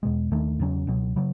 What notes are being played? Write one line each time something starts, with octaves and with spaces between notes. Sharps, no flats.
E2 B2 G#3
D#2 D#3 A3
E2 C#3 F#3 C#4
C#2 B2 F#3
C#3 F#3